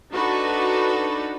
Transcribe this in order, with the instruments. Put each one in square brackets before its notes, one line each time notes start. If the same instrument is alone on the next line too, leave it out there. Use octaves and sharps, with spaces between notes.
[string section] D4 D#4 F#4 A4 B4